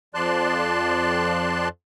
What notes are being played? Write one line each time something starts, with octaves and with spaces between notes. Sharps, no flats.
F2 F3 D5 A5 C6 F#6